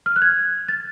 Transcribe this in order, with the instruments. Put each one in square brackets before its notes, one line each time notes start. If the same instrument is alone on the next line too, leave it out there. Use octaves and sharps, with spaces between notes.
[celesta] F6
F#6
G#6
A6